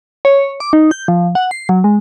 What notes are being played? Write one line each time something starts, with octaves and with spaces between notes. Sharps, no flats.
C#5
D6
D#4
G6
F3
F#5
C7
F#3
G#3